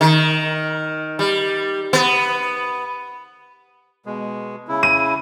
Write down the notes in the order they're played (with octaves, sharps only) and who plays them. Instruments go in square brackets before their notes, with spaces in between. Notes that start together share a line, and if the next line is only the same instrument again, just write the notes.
[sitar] D#3
G3
B3
[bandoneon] B2 G#3
C#3 E4
[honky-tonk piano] D#7